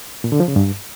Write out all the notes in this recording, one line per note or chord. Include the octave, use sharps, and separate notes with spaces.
A#2
D3
F3
C#3
G2